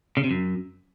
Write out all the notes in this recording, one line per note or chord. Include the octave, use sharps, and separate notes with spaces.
C#3
C3
F#2